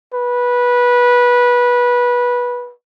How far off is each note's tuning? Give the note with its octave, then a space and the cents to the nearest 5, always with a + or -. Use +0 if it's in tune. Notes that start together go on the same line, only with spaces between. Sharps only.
B4 -20